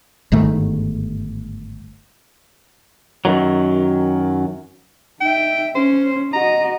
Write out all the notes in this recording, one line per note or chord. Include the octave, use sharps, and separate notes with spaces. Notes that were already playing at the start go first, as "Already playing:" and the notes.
G1 G#2 D#3 A3
F#2 A#2 D#3 F#3
D#4 E5 G5
C#4 C5
F#4 D#5 A#5